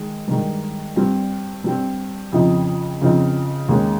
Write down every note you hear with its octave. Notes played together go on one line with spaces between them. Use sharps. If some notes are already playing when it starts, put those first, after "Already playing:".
Already playing: D#3 G#3
G2 D#3 G#3
G2 G3 C4
G2 G3 C4
F2 C#3 F3 C4 D#4
F2 C#3 F3 C4 D#4
D#2 D#3 G#3 C#4